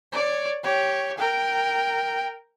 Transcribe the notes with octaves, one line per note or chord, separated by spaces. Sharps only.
C#5 D5
G4 C#5
A#4 G5